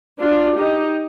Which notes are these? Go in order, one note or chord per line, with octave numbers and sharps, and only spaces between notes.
D4 F4
D#4 G4